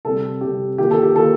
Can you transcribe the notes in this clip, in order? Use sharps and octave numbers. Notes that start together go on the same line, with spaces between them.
C3 G3 C4 A4
C3 G3 C4 G4
D#3 A#3 F4 G4
A4
G4
D#3 A#3 F4 A4